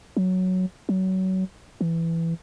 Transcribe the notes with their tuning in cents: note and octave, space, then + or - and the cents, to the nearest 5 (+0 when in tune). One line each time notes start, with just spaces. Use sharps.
F#3 +0
F#3 +25
E3 +10